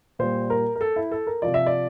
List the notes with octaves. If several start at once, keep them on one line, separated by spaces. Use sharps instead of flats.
A#2 G3 C5
A#4
A#4
A4
E4
A4
A#4
C3 F3 D5
E5
D5